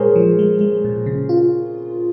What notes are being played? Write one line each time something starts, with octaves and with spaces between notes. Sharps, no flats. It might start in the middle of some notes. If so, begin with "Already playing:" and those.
Already playing: A#2 G#3 G#4 A#4 C5 C#5
F3
G#3
G#3
A#2
C#3
F4